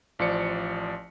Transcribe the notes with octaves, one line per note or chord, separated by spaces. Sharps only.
A1 F3 D5 C#7